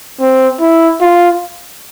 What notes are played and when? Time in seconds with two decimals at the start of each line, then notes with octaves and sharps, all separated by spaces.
0.20 C4
0.61 E4
1.01 F4